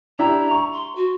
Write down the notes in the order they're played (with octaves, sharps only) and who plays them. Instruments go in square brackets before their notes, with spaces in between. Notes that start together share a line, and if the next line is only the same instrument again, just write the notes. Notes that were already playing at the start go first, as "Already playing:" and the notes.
[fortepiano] D4 E4 G4 [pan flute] A#5
[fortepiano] C#6
[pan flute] C6
F#4